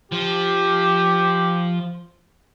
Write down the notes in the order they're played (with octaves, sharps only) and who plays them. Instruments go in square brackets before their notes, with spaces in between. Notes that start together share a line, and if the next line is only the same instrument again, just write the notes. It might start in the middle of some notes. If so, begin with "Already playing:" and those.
[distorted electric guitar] F3 F4 [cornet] G4